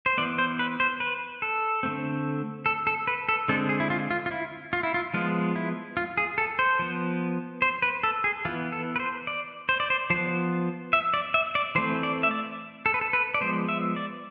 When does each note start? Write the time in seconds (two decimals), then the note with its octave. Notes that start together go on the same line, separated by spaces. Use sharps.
0.06 C5
0.18 E3 B3 D5
0.38 C5
0.59 B4
0.80 C5
1.00 B4
1.42 A4
1.83 D3 A3 C4
2.66 A4
2.87 A4
3.07 B4
3.29 A4
3.48 D3 G#3 C4 A4
3.69 G#4
3.80 E4
3.90 F4
4.11 F4
4.26 F4
4.31 E4
4.73 F4
4.83 E4
4.94 F4
5.14 F3 G#3 B3 F4
5.56 E4
5.97 F4
6.17 G#4
6.38 A4
6.59 C5
6.79 F3 B3
7.62 C5
7.82 B4
8.03 A4
8.24 G#4
8.45 E3 B3 F4
8.72 A4
8.96 B4
9.00 C5
9.27 D5
9.69 C5
9.80 D5
9.90 C5
10.10 F3 B3 C5
10.93 E5
11.14 D5
11.34 E5
11.55 D5
11.75 E3 A3 C4 C5
12.03 D5
12.23 E5
12.31 D5
12.86 A4
12.94 B4
13.01 A4
13.13 B4
13.34 D5
13.41 F3 G#3 B3 C5
13.69 E5
13.96 D5